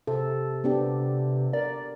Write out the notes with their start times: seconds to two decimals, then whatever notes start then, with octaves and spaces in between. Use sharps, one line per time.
0.07 C3 A4
0.64 B3 D4 G4
1.53 A#4 D5